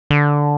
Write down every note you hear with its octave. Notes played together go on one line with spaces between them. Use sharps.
D3